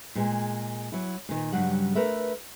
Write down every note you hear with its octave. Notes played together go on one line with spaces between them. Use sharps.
A#2 G#3
F#3 E4
A#2 D#3
G2 C#3 F#3 G3 F#5
A3 A#4 B4 E5